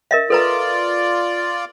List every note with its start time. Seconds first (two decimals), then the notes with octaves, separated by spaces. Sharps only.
0.11 A#4 D#5 E5
0.30 F4 A4 B4 D5 A#5